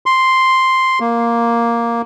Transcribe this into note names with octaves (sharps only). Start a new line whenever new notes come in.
C6
A#3